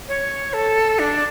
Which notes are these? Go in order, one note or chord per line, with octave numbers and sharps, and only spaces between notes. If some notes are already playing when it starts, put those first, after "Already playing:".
C#5
A4
D4